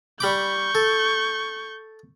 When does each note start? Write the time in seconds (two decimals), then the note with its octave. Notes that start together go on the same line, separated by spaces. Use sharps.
0.20 G3 B5 C#6 D6 G6
0.75 A4